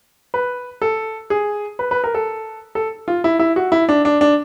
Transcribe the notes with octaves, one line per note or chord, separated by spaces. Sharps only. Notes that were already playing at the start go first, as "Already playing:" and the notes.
B4
A4
G#4
B4
B4
A#4
A4
A4
F4
E4
E4
F#4
E4
D4
D4
D4